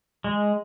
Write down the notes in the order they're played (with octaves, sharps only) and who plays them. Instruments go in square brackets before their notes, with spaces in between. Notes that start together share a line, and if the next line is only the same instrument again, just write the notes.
[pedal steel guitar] G#3